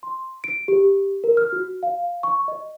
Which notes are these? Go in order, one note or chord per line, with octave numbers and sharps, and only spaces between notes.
C6
D7
G4
A#4
F6
F#4
F5
C#6
D#5